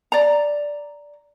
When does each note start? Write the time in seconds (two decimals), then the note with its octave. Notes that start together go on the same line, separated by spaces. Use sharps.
0.12 D5 A#5